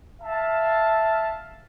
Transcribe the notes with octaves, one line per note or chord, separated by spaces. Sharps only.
E5 F5 A5